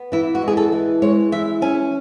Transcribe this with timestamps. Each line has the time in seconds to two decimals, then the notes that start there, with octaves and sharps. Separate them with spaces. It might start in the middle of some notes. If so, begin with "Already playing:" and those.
Already playing: B3
0.12 E3 E4
0.35 F#4
0.42 G#3
0.48 G#4
0.57 A4
0.72 E3
1.02 G#3 C#5
1.32 E3 E5
1.62 C#4 G#5